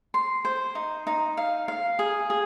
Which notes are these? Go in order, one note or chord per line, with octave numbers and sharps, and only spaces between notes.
C6
C5
D#4
D#4
F5
F5
G#4
G#4